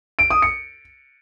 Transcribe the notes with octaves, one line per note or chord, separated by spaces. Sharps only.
D7
D#6
C#7